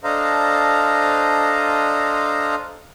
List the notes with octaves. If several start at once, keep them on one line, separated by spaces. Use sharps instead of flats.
D4 A4 C5 D#5 F5 A#5